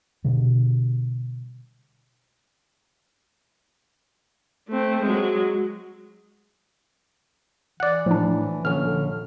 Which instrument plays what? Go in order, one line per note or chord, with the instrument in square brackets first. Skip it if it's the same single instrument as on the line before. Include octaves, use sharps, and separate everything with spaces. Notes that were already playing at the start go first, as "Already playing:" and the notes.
[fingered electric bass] B2 D3 G3
[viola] A3 C4
F#3 G#3
[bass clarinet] E3 [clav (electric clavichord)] D5 F#5
[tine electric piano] A2 [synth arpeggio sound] F3 D4
[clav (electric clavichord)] A#1 C#4 [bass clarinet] D3 [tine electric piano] F6
[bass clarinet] D3